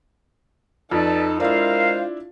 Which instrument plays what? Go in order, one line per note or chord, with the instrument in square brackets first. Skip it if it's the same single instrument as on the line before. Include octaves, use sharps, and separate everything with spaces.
[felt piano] F2 [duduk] D#4 [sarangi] A4 [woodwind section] B4 D5 A5
[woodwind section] G#3 C5 F5 [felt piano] D4 E4 [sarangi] F4 [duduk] A#4